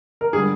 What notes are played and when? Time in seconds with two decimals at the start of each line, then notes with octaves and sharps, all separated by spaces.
0.21 A#4
0.33 D3 G3 G#4